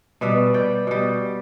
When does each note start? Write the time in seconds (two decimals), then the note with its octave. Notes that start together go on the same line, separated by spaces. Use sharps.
0.21 B2 G3 B4 E5
0.54 D5 G5
0.87 B2 G3